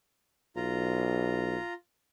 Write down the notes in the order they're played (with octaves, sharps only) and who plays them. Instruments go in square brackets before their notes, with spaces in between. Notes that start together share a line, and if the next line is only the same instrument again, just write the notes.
[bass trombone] B1 [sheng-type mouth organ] F4 A#5